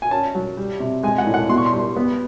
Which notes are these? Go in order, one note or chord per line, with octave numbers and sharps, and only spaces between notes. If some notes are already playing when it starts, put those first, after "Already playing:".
G#5
C#4 A5
F#3
G3
C3
G#3 G#5
F#5
A2
F#5
B2 C6
C#6
C6
G3
B3